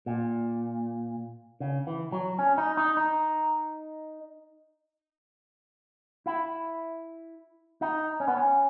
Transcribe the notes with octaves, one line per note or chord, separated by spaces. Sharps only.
A#2
C#3
E3
F#3
C#4
D#4
D#4
D#4
E4
D#4
C#4
B3
C#4